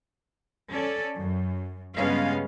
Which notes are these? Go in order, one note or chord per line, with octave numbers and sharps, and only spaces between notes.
C#4 A4 D5
F#2
G2 C#3 G#3 B3 C#4 F5